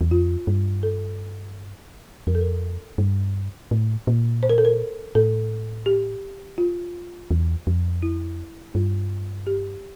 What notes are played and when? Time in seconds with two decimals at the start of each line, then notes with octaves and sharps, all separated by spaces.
0.01 E2
0.11 F2 F4
0.47 G2
0.83 A4
2.27 F2 A#4
2.35 A4
2.41 A#4
2.98 G2
3.71 A2
4.07 A#2
4.43 C5
4.50 A#4
4.58 A4
4.65 A#4
5.15 A2 A4
5.86 G4
6.58 F4
7.31 E2
7.67 F2
8.03 E4
8.74 G2 F4
9.47 G4